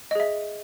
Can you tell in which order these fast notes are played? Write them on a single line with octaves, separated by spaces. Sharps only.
D#5 G#4 E5